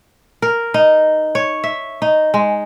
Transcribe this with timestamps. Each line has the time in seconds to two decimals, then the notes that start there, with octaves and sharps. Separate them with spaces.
0.42 A#4
0.74 D#4
1.35 C#5
1.64 E5
2.02 D#4
2.34 G#3